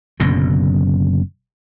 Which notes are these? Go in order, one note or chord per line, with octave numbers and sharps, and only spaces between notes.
F#1 F#2 B2 D3